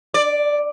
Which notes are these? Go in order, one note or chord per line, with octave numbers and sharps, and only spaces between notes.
D5